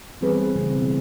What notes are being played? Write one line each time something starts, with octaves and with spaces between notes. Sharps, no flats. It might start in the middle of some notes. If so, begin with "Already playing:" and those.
E3 G3 B3 C4 G#4 B4
C#3 E3 G3 A3 C4
B2